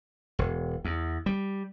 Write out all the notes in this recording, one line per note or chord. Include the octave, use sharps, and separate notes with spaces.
E1
E2
G3